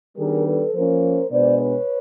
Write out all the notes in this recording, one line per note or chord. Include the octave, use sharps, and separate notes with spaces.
D#3 G3 B3 D4 G#4 A#4
A4 B4
F3 A#3 C#4 A#4 C5
B2 G#3 B3 D4 C5 D5
B4 C#5